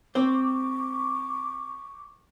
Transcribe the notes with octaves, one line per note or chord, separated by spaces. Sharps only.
C4 C5 C#6 D6